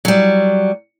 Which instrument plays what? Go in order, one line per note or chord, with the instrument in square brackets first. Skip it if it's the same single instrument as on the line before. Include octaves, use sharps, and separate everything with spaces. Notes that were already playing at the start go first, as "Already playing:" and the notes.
[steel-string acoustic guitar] F#3 G3